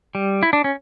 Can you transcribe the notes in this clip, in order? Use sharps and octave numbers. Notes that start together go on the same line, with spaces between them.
G3
E4
D4
C#4